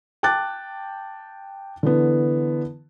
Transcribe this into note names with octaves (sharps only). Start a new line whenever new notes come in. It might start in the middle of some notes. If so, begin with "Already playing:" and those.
G5 A5 D6 F#6 A6
D3 E3 B3